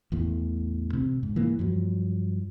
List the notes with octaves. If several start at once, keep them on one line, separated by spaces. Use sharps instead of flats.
A1 E2 A2
C3
G#2
E3 A#3
G2 F3 F#3